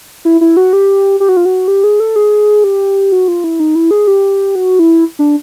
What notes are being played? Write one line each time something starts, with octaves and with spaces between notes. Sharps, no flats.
E4
E4
F#4
G4
G4
F#4
F4
F#4
G4
G#4
A4
G#4
G4
F#4
F4
E4
D#4
E4
G#4
G4
F#4
E4
D4